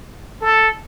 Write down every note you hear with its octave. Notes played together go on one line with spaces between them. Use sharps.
A4